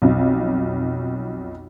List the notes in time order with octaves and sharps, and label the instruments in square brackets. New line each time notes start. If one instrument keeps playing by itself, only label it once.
[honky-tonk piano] B1 F2